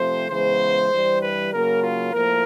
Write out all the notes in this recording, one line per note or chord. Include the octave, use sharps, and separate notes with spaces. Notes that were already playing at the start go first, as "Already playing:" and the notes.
Already playing: C3 F3 A3 C4 C5
C#3 E3 G#3 B3 C5
G2 E3 G3
B4
C#3 F#3 A#3 A#4
F4
A2 F3 A#3 A#4